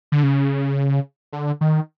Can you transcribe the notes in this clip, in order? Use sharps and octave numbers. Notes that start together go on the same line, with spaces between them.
D3
C#3
D3
D#3